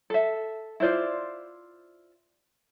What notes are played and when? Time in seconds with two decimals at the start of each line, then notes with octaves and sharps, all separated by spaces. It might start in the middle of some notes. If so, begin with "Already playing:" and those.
0.10 A4 E5
0.80 E4 F4 C5 D5